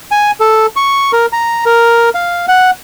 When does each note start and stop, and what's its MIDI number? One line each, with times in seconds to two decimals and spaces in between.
0.11 0.31 80
0.40 0.66 69
0.76 1.11 85
1.13 1.26 70
1.33 1.65 82
1.66 2.09 70
2.15 2.46 77
2.48 2.71 78